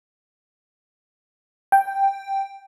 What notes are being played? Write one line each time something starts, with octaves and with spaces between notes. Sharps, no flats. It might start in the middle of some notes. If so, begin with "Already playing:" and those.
G5